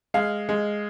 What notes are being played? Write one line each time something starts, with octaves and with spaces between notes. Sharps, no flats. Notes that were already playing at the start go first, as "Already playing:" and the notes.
G#3 F5
G#3